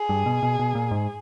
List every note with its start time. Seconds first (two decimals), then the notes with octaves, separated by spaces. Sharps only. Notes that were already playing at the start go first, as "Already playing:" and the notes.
Already playing: G#4
0.09 G2
0.26 B2
0.43 B2
0.59 B2
0.75 A#2
0.91 G#2